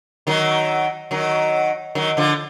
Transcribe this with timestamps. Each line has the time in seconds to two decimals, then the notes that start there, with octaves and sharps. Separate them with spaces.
0.27 D#3 F#3
1.11 D#3 F#3
1.95 D#3 F#3
2.17 D3 F3